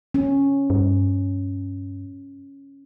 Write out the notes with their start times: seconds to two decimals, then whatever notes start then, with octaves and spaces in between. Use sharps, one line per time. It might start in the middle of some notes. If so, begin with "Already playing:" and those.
0.14 C#4
0.70 G2